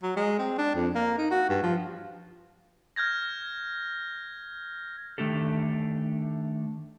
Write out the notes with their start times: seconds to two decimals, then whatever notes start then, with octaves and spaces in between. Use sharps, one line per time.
0.03 F#3
0.17 G#3
0.39 C4
0.58 D4
0.75 F2
0.95 A#3
1.18 D#4
1.31 F#4
1.50 G2
1.63 F3
2.96 F6 G6 G#6 A#6
5.18 D#3 A3 D4 G4 A4